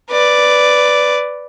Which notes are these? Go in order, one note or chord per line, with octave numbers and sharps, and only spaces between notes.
B4 D5